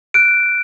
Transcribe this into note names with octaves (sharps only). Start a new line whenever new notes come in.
F#6 D7